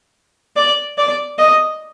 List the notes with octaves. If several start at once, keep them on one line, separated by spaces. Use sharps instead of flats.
D5
D5
D#5